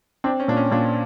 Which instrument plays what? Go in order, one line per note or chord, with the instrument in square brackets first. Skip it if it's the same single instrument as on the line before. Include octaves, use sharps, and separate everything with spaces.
[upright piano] C4 [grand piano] D4
[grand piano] C#4
[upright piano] A#2 [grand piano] D4
[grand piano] C#4
[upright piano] A#2 [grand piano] D4